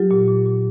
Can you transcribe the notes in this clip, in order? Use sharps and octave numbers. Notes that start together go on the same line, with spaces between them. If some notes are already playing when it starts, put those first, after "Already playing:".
Already playing: F#3 F4 G4
A#2
A#2
A#2